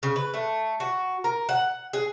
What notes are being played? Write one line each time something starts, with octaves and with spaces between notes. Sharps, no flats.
C#3
B4
A3
F#4
A#4
F#5
G#4